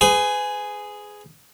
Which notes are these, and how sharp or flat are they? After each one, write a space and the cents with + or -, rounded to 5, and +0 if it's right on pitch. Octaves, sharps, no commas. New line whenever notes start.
G#4 +0 B4 +35